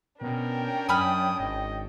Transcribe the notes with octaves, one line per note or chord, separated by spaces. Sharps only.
B2 C#4 D4 A#4 G5
F#2 G#5 B5 D#6 F6
G#1 D#5